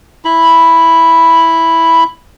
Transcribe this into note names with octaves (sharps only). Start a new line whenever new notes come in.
E4 B5